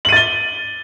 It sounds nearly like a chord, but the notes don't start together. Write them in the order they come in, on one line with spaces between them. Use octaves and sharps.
F#7 D#7 A6 G7